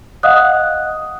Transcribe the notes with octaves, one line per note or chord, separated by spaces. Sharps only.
D#5 F5 F#5 D#6 F#6